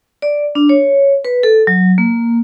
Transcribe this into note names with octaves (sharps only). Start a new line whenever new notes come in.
D5
D4
C#5
B4
A4
F#3
A#3